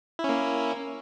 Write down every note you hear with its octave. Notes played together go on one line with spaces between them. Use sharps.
A#3 C#4 E4